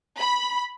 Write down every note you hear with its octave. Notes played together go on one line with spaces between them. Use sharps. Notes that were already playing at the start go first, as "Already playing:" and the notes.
B5